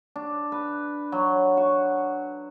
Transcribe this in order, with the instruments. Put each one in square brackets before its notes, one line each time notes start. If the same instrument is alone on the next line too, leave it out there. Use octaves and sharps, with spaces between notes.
[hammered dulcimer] D4
B4
F#3
F#4